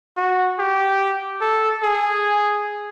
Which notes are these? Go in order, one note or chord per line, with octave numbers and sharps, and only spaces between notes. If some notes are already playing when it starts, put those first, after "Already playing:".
F#4
G4
A4
G#4